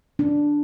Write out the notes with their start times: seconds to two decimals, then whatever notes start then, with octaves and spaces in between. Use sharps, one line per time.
0.19 D4